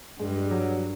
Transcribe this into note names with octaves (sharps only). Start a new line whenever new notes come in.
G2 G#3
F#3